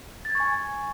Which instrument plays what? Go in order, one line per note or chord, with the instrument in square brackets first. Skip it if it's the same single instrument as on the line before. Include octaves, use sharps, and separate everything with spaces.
[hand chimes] A6
G#6
C#6
G#5